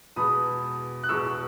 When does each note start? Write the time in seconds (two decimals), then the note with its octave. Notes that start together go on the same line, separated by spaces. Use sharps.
0.16 E2 B2 G#3 B5 D#6
1.03 F#6
1.09 E2 B2 G#3 C#6 E6